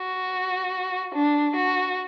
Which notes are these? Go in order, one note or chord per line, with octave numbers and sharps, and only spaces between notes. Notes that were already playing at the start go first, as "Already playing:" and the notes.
Already playing: F#4
D4
F#4